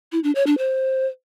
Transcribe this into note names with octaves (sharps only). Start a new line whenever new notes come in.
E4
D4
C#5
D4
C5